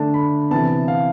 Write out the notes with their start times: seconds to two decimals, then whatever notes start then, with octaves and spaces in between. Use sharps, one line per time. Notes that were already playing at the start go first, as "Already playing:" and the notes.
Already playing: D3 A3 D4 A5
0.14 B5
0.51 C3 E3 B3 A5
0.88 F5